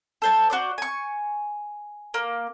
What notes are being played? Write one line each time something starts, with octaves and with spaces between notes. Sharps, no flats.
A4 C5 A5
F#4 C5 D5
G#5 C#6
A#3